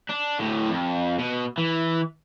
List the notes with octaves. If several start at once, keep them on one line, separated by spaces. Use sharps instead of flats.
D4
D2 A2
F2
B2
E3